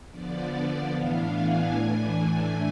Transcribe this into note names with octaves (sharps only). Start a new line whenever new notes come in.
D3 F3 B3 D5
A2 E3 B3 D4 F5
G#5
A2 E3 A3 D4